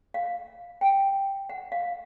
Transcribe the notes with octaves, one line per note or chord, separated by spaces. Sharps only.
F5
G5
F#5
F5